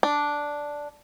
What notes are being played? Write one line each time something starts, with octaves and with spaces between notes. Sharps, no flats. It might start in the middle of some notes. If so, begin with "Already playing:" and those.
D4